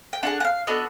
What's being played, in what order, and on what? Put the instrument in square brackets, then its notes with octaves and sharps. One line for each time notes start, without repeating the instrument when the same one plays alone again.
[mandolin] G5
D4 F4 G#4 F#5
F#5
F5
B3 D4 F#4 A4 D#5